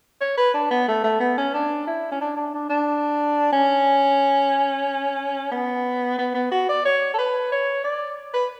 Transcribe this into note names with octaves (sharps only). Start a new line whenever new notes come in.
C#5
B4
D4
B3
A3
A3
B3
C#4
D4
E4
C#4
D4
D4
D4
D4
C#4
B3
B3
B3
F#4
D5
C#5
A4
B4
C#5
D5
B4